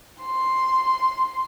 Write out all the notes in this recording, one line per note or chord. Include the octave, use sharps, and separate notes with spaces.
C6